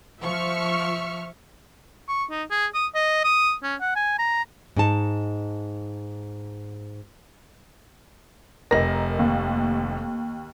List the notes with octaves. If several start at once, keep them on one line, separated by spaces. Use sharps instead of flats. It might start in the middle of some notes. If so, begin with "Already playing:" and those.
F3 E5 C#6 F6
C#6
D#4
G#4
D#6
D#5
D#6
C#4
F#5
G#5
A#5
G#2 D#4 A5
F1 A#4 D#5 A#6
D#2